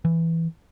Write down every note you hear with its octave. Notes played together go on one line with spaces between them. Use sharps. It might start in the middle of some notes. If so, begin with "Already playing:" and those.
E3